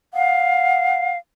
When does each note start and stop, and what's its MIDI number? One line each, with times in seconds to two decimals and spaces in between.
0.14 1.17 77
0.14 1.08 78